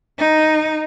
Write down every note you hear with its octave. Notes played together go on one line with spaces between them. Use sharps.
D#4